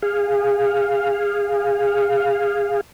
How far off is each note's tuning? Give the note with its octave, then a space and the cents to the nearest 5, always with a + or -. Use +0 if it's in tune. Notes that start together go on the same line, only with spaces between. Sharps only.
G#4 -25 F5 +0